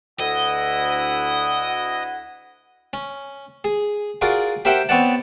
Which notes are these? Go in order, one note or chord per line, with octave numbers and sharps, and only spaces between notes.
D2 E4 D#5 F#5
C#4
G#4
F4 F#4 G#4 A#4 D5
G4 A#4 C5 E5 F#5 G5
B3 C4 C#5 D5 F#5 A5